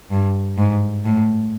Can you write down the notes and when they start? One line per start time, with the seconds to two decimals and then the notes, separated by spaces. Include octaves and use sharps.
0.11 G2
0.58 G#2
1.05 A2